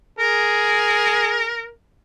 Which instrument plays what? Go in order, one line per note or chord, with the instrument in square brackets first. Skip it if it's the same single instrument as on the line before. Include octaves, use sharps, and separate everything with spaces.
[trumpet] G#4 [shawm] A#4